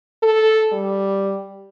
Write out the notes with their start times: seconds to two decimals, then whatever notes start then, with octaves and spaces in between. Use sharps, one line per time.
0.23 A4
0.72 G3